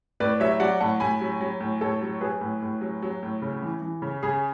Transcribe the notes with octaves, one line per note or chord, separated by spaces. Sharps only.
A2 B4 D5
F#3 C#5 E5
F#3 D5 F#5
A2 F#5 A5
A2 G#5 B5
F#3
F#3
A2
A2 A4 C#5
F#3
F#3 G#4 B4
A2
A2
F#3
F#3
A2
C#3
E3
E3
C#3
C#3 G#4